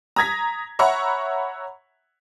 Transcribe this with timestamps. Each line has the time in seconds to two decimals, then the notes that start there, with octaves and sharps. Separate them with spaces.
0.16 A#5 D#6 G#6 A#6 B6
0.79 C#5 E5 F#5 A#5 B5 C#6